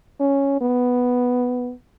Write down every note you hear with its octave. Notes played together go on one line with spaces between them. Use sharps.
C#4
B3